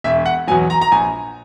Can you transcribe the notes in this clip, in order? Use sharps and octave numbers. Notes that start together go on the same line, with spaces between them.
E1 E5
F#5
E2 B2 F#3 G#5
A#5
A#5
A#1 G#5